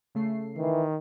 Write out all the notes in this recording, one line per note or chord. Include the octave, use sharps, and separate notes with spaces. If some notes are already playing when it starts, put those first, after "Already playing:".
C#3 A3 C7
D#3 E3